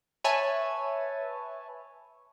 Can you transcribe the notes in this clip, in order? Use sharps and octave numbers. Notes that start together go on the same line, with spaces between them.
B4 C#5 E5 G#5 A5